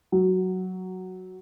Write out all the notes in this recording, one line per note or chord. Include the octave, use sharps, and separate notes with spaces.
F#3